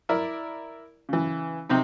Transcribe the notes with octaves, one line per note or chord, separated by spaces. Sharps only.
E4 A#4 D5
C#3 E3
C3 C4 D#4